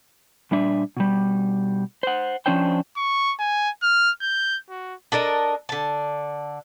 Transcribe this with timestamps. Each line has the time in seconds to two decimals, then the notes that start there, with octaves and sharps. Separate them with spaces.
0.51 A#2 G3 D4 E5
0.97 B2 G3
2.03 C5 F#5
2.46 F3 G#3 C#4 D4 C5 G5
2.97 C#6
3.39 G#5
3.83 F6
4.21 G6
4.70 F#4
5.12 D4 A4 A#4 D#5
5.69 D3 A5